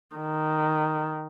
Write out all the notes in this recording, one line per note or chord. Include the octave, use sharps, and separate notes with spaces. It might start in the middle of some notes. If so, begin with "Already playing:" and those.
D#3